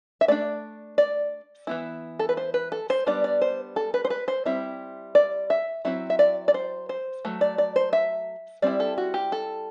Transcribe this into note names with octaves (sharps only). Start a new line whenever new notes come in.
E5
A3 D4 D5
D5
E3 B3 E4
A4
B4
C5
B4
A4
C5
G3 B3 D4 D5
D5
C5
A4
B4
C5
B4
C5
G3 C4 E4 E5
D5
E5
F#3 C4 E4 E5
E5
D5
D5
C5
C5
F#3 A3
D5
D5
C5
E5
G3 C4 E4 D5
A4
F#4
G4
A4